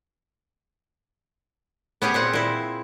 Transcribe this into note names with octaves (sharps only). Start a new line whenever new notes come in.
B3 C#4 G4 G#4
A#2 C4 F#5
A#2 E4